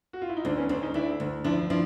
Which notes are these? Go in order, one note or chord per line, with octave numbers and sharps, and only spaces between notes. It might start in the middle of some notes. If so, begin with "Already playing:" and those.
F#4
F4
E4
D#4
D2 C4 D4
B3 C#4
D2 C4 D4
C#4 D#4
D2 D4 E4
D2
F3 D4 E4
F3 D4 E4